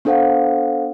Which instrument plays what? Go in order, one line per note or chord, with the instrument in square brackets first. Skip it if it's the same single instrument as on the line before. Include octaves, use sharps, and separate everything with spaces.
[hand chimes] B3 D4 A4 C5 F5 F#5